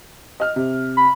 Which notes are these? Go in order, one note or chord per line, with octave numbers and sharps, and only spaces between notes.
D#5 F6
C3
B5